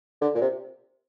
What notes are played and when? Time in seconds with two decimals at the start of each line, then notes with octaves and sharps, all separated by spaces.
0.21 D3
0.35 A#2
0.41 C3